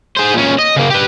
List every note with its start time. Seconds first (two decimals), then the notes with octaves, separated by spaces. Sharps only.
0.17 G#4 C5
0.35 A#2 C#4
0.59 D#5
0.76 C#3 A#3
0.90 G4 B4